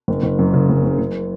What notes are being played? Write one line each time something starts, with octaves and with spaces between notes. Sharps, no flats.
F#1
F#1
F#2
C#3
F#1
F#1
F#1